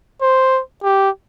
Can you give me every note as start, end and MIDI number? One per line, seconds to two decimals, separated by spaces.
0.22 0.61 72
0.83 1.10 67